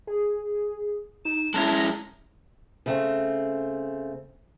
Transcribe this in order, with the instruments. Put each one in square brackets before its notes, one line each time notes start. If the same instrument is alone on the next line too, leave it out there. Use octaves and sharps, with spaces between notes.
[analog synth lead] G#4
[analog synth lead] D#4 [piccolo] E7
[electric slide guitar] G#3 C#4 E4 [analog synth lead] A5 [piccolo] A#5
[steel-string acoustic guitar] C#3 A3 C4